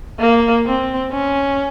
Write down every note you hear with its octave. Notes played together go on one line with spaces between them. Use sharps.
A#3
C4
C#4